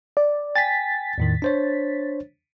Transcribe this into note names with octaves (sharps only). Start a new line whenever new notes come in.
D5
G5 G#5 A6 B6
E2 A2 D#3
D4 C5 C#5